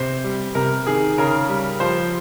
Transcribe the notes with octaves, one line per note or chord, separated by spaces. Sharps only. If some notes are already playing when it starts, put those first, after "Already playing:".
Already playing: C3 C5
G3
C3 A#4
D#3 G#4
C#3 A#4
G3
F3 C5